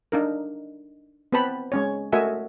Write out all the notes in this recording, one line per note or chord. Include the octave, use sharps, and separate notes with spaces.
D4 D#4 A#4
B3 C4 B4 G5 A5 B5
G#3 C#4 C#5
A3 F#4 A#4 D#5 E5 G#5